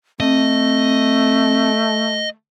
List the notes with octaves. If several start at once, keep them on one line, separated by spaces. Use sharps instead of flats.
A3 C4 D#5